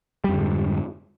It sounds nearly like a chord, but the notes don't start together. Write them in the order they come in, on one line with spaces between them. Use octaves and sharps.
G3 F2 D3 G#2